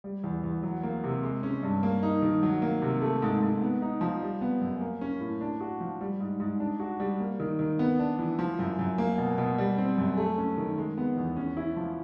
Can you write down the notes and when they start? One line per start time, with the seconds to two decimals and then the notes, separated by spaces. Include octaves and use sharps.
0.04 G3
0.24 E2
0.44 E2
0.63 F#3
0.83 A#3
1.04 C3
1.23 G#3
1.43 C#4
1.63 G2
1.83 A#3
2.03 D#4
2.22 D#3
2.43 F#3
2.62 A#3
2.82 C3
3.02 A3
3.22 G#2
3.42 G#2
3.62 B3
3.82 D#4
4.01 F3
4.22 G3
4.41 B3
4.61 F#2
4.81 A#3
5.01 C#4
5.20 A2
5.41 D4
5.60 F#4
5.80 F3
6.01 G3
6.20 G#2
6.40 G#2
6.60 D4
6.80 F#4
7.00 G3
7.20 A#3
7.40 D#3
7.59 D#3
7.79 B3
7.99 D4
8.19 E3
8.39 F3
8.59 F#2
8.79 F#2
8.98 A#3
9.18 B2
9.38 B2
9.58 G3
9.78 C4
9.98 F#2
10.18 A3
10.38 C#4
10.57 D#3
10.78 G#3
10.98 B3
11.17 E2
11.36 C#4
11.57 E4
11.77 F3